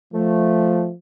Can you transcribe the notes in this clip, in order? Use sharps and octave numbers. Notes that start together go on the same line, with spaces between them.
F3 A3